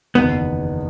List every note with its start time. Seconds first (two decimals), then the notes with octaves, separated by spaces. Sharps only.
0.15 F#1 E2 D#3 B3